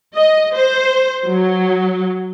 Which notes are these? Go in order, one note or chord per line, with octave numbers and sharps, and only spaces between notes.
D#5
C5
F#3